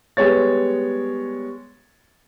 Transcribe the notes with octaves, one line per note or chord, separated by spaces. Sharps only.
G3 G#3 B3 C#5 A6